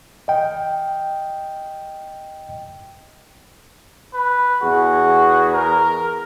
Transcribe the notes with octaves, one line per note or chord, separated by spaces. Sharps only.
D#5 G5
B4
E2 F#4 G#4
A#4